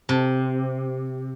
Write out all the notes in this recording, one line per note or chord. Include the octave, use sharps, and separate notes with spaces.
C3